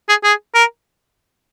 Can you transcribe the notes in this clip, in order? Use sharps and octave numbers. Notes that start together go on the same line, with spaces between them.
G#4
G#4
A#4